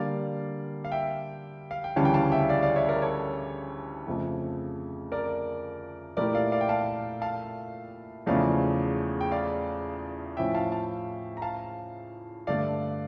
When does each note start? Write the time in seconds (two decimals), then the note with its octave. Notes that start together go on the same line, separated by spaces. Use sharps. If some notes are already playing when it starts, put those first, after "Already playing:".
Already playing: D3 G3 A#3 D5 F5
0.85 F5
0.92 E5 G5
1.71 F5
1.84 G5
1.96 D2 C#3 E3 G3 C#4 F5 A5
2.05 G5
2.14 F5 A5
2.32 E5 G5
2.49 D5 F5
2.63 D5 F5
2.76 C#5 E5
2.89 A#4 D5
3.02 A4 C#5
4.06 F2 C#3 F3 A3
5.12 A#4 D5
6.17 A#2 A3 E4 G4 A#4 D5
6.35 D5 F5
6.52 D5 F5
6.61 G5
6.69 F5 A5
7.22 F5 A5
8.26 E2 C#3 F3 A3 C#4 D5 F5
9.21 G5
9.32 D5 F5
10.37 A2 F3 C#4 E4 E5 G5
10.55 F5 A5
10.72 F5 A5
11.37 A#5
11.42 F5 A5
12.47 G2 D3 A3 D5 F5